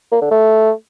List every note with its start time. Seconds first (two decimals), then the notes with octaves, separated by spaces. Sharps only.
0.12 A#3
0.21 D3
0.31 A3